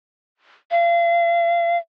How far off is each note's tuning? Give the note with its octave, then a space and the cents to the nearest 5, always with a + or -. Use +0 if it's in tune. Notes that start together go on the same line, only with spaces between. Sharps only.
F5 -35